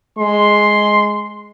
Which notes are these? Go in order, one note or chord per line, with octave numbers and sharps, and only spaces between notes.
G#3 C6